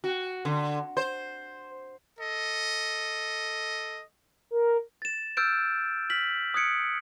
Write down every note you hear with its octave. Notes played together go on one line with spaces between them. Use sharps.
F#4
D3
C5
A4 D#5
A#4
A6 E7
E6 F6 G6 A6 D7
F6 B6 F#7
D#6 F#6 G#6 C#7 D7